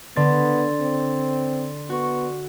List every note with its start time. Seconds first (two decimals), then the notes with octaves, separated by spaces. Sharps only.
0.16 D3 B3 D5 C6 A6
0.81 C4
1.90 B3 F#4